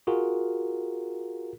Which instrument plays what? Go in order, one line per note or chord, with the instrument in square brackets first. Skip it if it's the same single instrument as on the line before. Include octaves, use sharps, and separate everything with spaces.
[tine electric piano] F4 F#4 G#4 A#4